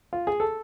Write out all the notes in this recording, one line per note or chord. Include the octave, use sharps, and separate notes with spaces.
F4
G#4
A4